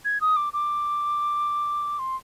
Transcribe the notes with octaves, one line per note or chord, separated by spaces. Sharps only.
G#6
D#6
D6
D6
C6